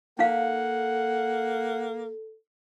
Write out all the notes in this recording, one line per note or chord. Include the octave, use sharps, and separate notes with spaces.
A#3 D#4 A4 F5 F#5